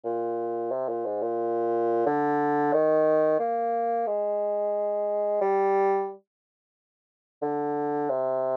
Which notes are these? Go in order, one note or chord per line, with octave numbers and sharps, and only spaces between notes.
A#2
C3
A#2
G#2
A#2
D3
D#3
A#3
G#3
G3
D3
C3